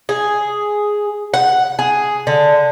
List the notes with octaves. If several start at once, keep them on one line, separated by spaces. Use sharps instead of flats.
G#4
F#5
G#4
D3